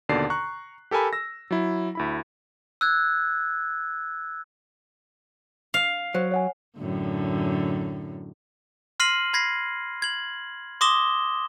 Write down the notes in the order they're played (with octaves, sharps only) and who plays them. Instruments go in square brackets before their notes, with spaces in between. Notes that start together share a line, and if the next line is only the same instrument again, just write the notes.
[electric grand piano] D#2 B2 D3 D5 C7
A#5 C#6 F#6
G4 A4 A#4 G#5 B5
E6 A#6
F#3 E4
D2 E4 B5
[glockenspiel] E6 F#6 G#6
[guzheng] F5
[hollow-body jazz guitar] F#3 [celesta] C5
[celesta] C#5 F#5 G#5
[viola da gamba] F#2 A2 D3
[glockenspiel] C6 F6 A#6 C7 D#7 F#7
B5 G#6 A#6 C7
G#6 F#7
C6 D6 D#6 A#6 E7 G7